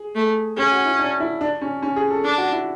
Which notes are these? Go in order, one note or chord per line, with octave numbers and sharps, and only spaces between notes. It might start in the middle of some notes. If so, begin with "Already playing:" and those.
Already playing: G#4
A3
C#4 G#4
F#4
E4
D4
E4
D4
C#4
C#4
G#4
A4
D4
F#4
E4